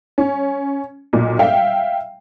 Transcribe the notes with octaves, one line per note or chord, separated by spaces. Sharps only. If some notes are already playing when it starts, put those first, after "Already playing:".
C#4
B1 A#2
E5 F5 G5